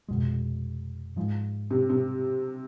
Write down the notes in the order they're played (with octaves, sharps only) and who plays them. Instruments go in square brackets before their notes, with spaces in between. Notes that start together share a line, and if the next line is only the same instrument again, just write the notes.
[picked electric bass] F1 E2 B2 G#3
G#2 F3 G#3
[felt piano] C3
C3